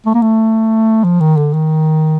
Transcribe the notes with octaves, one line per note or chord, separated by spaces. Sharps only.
A3
A#3
A3
F3
D#3
D3
D#3